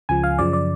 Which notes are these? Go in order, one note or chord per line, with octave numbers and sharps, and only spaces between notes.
C#2 C#3 F3 G#5
F5
F#2 C#3 F3 D5
D5